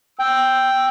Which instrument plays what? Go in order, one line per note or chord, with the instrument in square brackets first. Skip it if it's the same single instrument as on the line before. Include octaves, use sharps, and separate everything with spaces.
[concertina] G5 [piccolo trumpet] E6